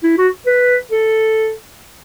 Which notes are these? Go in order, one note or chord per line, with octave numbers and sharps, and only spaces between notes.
E4
F#4
B4
A4